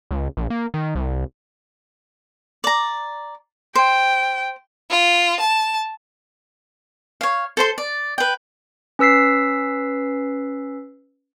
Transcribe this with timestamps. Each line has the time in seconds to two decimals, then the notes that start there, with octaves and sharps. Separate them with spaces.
0.11 C#2
0.37 A#1
0.50 A#3
0.74 D#3
0.95 C2
2.64 D5 A#5
3.75 C5 G5
4.90 F4
5.40 A5
7.21 C#5 F5
7.57 A4 C5 C6
7.78 D5
8.18 B4 G5
8.99 C#4 B4 E6 B6 C7